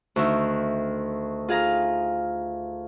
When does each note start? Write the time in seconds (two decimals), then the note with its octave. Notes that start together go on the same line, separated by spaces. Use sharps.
0.16 D2 D#3 E5
1.48 F4 G#4 F5 A#5